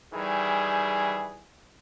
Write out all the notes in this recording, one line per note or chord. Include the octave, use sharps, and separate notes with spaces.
D#3 E3 G3 G#4